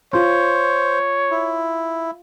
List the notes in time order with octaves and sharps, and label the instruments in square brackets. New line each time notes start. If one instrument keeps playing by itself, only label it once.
[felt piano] F4 [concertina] C5 [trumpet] C#5
[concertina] E4